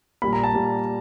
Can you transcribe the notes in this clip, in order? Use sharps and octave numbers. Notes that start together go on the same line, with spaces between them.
A#2 G3 A#3 B5
A#5
A5
A#2 G3 A#3